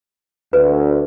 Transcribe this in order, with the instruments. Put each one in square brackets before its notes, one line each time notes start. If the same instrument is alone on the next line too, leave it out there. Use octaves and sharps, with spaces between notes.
[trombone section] D2 [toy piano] B4